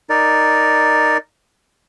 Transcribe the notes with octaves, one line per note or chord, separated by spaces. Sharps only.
D#4 A#4 D5